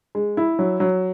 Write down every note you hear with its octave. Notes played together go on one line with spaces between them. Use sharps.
G#3
E4
F#3
F#3